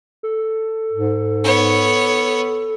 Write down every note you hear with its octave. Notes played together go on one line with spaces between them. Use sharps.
A4
G#2
B3 C#5